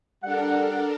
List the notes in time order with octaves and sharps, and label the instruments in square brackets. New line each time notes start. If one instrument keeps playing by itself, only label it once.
[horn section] G3 F#5 [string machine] D4 A4 A#4